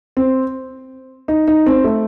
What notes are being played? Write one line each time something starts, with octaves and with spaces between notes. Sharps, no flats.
C4
D#4
D#4
C4
A3